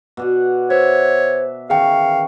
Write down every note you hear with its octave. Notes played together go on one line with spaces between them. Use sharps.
B2 D5 F#5
C5 C#5 E5
D#3 E3 C#4 G#4 F5 G5